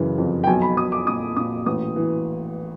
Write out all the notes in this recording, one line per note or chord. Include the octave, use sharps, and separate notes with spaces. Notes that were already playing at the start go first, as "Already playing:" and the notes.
Already playing: F#1 C#3 E3
F2
G5
B1 G#5
B5
B1 D#6
D6
A#2 D#6
A#2 D#6
A1 D#6
E3